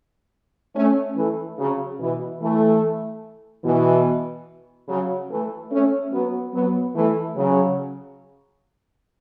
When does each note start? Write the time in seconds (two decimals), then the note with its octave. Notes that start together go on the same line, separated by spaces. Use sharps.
0.75 A3 C#4
1.16 E3 A3
1.58 C#3 F#3
1.99 B2 E3
2.41 E3 A3
3.64 B2 E3
4.89 C#3 F#3
5.30 E3 A3
5.71 A3 C#4
6.12 F#3 B3
6.54 F#3 B3
6.95 E3 A3
7.36 C#3 F#3